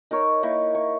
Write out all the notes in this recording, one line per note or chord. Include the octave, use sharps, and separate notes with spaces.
D#4 A#4 C#5
A#3 D#4 E4 C#6
C#6